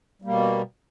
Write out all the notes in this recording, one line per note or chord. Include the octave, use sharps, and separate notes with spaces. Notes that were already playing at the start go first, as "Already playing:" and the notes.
B2 G3 A#3